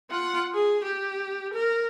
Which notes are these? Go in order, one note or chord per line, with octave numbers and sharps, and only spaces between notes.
F4 F#5
G#4
G4
A#4